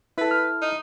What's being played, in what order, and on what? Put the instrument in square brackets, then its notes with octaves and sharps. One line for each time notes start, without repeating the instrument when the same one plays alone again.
[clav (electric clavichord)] E4 A4 [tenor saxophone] B4
[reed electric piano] F6
[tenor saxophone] D#4